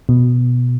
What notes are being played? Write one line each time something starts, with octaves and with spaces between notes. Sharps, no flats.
B2